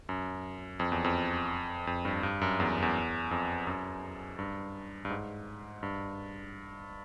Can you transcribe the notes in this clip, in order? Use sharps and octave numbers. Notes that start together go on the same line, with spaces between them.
F#2
F2
E2
F2
F2
G2
G2
F#2
E2
E2
F2
F#2
G2
G2
G#2
G2